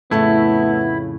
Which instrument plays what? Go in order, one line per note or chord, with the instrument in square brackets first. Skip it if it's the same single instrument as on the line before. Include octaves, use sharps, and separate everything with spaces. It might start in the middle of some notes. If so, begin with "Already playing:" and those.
[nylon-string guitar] F2 A2 C#3 [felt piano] A3 [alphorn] B3 [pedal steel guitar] E4